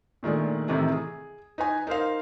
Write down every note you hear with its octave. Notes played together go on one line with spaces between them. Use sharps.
A#2 D#3 G#3 A3 D4
A2 C3 D#3 E3 A3
G#4
D#4 B4 G#5
D#4 A#4 C5 F5